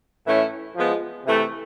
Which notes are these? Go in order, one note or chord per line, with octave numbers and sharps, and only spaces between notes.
A2 E3 A3 C#4 E4
F3 G#3 B3
C3 E3 A3